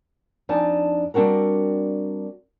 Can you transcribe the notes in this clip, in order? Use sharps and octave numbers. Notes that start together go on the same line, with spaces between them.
F2 D4 D#4 G#5 A5
G3 C4 D4 F#4 A#4